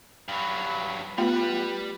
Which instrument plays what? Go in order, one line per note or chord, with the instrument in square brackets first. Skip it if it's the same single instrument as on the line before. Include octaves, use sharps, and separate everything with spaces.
[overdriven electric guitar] G2 F#3 [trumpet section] B5
[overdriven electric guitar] G3 B5 [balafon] A3 B3 F4 [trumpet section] B4